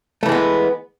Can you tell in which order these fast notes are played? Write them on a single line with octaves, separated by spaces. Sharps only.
A3 E3 G#3 B3